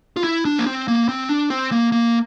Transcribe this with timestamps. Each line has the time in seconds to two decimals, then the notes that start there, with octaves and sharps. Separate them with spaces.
0.16 F4
0.24 E4
0.45 D4
0.58 A#3
0.66 C4
0.88 A#3
1.09 C4
1.29 D4
1.50 C4
1.72 A#3
1.92 A#3